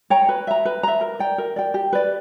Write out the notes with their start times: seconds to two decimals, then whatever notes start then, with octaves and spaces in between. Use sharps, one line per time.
0.10 C#5 G5 A#5
0.29 B4
0.47 E5 A#5
0.65 B4
0.83 E5 A#5
1.01 A#4
1.19 D5 G5
1.38 A#4
1.56 D5 G5
1.74 G4
1.93 B4 D5